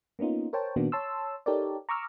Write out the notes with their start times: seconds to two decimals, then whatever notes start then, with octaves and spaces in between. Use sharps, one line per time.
0.19 A#3 B3 C#4 D#4 F4
0.53 A#4 C5 C#5 G5 A5
0.76 A#2 D#3 A#3 B3 D4 F#4
0.92 C#5 A5 C6 E6
1.46 D#4 G4 A4 A#4 C#5 D5
1.89 A#5 C#6 D6 E6 F6